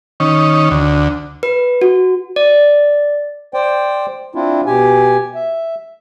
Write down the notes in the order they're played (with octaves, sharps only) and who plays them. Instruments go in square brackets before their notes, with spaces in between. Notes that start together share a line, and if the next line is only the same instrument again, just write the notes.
[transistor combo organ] D#3 C#4
D2
[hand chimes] B4
F#4
[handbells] D5
[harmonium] C5 D5 G5
C4 D4 E4 F4
B2 G4 G#5
E5